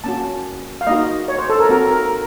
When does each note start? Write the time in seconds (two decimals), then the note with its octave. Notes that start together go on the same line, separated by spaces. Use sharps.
0.04 A#3 C#4 F#4 A5
0.81 F5
0.87 A#3 D#4 F#4 D#5
1.28 C#5
1.39 C5
1.50 A4
1.59 A#4
1.69 C4 F#4 A#4
1.91 A#4